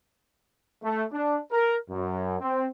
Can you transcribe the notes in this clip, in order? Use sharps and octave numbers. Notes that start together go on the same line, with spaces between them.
A3
D4
A#4
F#2
C4